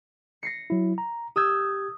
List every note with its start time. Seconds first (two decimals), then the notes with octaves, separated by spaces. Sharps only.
0.43 A#6 C7 C#7
0.70 F#3 E4
0.98 A#5
1.36 G4 D#6 E6 G6 G#6